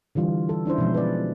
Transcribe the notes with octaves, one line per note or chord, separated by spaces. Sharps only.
D3 E3 G3 F4
A4
C#4 D4 E4 C5
B2 F3 G#3
B4 D5